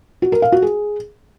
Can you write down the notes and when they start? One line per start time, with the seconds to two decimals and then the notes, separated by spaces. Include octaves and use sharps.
0.22 F#4
0.32 A#4
0.42 F5
0.52 F#4
0.62 G#4